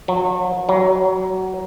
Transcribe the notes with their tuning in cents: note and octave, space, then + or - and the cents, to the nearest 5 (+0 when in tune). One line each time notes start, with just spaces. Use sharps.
F#3 -35
F#3 +20